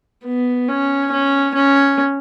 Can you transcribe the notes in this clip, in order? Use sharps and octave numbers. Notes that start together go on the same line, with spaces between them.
B3
C#4
C#4
C#4